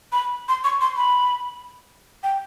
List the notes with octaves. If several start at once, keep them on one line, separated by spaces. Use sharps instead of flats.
B5
C6
C#6
C6
B5
G5